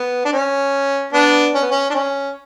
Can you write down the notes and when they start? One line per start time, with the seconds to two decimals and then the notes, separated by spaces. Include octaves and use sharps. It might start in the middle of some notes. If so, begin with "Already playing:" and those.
Already playing: B3
0.25 D4
0.33 C#4
1.13 B3 D4
1.55 C#4
1.62 B3
1.70 C#4
1.90 D4
1.94 C#4